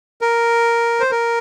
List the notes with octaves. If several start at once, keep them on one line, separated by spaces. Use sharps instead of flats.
A#4
C5
A#4